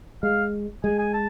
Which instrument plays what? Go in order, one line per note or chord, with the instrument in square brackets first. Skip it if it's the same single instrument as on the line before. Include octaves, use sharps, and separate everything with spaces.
[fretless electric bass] G#3 [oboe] F5
[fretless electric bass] G#3 [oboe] G#5
[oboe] G#5
A5